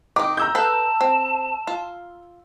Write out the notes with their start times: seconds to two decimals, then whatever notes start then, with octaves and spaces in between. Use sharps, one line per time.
0.16 D#3 D#4 D6
0.37 A#5 E6 G6
0.55 A4 B4 F5 A5
1.01 C4
1.67 F4